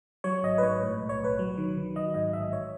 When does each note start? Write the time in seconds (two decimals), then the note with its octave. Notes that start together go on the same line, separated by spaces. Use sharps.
0.24 F#3 C#5
0.43 G#1 D#5
0.58 B4
0.62 G#2 C#5
0.82 A2
1.00 B1
1.09 C#5
1.20 B1 B4
1.39 F#3
1.58 D#3
1.77 D#3
1.96 F#3 D#5
2.14 G#2 D#5
2.33 A1 E5
2.53 C#5